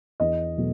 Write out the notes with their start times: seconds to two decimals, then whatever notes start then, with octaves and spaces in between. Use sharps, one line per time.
0.20 E2 D#5
0.57 B2 F#3 A3